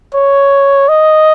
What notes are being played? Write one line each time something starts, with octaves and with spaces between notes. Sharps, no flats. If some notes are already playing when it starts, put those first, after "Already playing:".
C#5
D#5